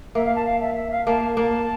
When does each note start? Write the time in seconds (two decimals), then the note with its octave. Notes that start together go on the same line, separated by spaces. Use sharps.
0.15 A#3 E5
0.25 F5
0.36 A5
0.46 F5
0.61 E5
0.76 E5
0.91 F5
1.07 A#3 A5
1.37 A#3 A5